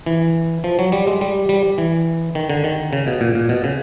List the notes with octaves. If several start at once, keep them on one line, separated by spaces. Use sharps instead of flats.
E3
F3
F#3
G3
G#3
G3
G3
E3
D#3
D3
D#3
C#3
B2
A#2
A#2
B2
C#3